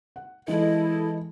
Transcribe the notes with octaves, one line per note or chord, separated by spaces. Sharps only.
F#5
E3 G#3 E4 A4 D#5